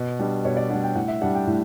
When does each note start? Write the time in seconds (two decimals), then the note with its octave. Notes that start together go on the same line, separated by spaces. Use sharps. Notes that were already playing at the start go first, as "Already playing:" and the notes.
Already playing: B2
0.19 G3 D4
0.45 B2 C#5
0.57 D5
0.70 G3 D4 F#5
0.83 G5
0.95 A2 F#5
1.08 E5
1.22 G3 D4 F#5
1.35 G5
1.47 A2